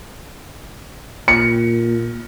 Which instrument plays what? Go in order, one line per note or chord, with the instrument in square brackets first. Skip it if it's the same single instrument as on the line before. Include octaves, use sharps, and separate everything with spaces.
[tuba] A#2 [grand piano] C#7